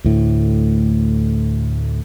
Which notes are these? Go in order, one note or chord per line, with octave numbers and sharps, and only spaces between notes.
D2 A2